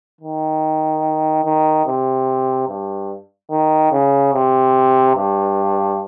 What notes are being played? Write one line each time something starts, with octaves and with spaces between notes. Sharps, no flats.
D#3
D#3
C3
G2
D#3
C#3
C3
G2